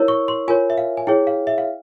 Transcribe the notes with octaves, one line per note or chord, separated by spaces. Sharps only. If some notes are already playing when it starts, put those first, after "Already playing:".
Already playing: E4 A#4 C#5 E6
C#6
C6
F4 A#4 C#5 G#5
E5
F5
G#5
E4 G#4 C#5 G5
F5
E5
F5